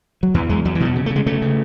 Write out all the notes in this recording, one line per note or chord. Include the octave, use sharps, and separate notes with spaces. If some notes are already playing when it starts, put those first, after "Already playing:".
F#3
E2 E3
E2 G#3
E2 F#3
E3
B2 F#3
C#3
A3
C#3
G#3
C#3 A3
C#3